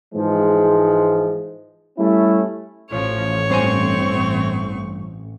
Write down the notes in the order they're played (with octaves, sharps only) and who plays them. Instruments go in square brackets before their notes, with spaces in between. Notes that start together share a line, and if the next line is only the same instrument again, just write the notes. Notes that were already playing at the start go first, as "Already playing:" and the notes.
[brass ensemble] G#2 E3 F3 G#3
G3 A3 C#4 E4
[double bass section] A1 [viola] F3 [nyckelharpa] C#5
[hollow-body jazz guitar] G2 C5 G#5 [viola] C4 C#6